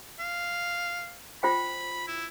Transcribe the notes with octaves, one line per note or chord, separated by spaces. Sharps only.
F5
F4 C5 G5 B5
E4